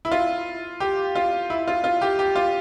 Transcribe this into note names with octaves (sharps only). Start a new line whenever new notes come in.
E4
F4
G4
F4
E4
F4
F4
G4
G4
F4